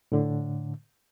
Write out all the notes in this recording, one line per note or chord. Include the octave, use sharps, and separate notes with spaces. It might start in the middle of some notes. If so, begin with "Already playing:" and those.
A2 D3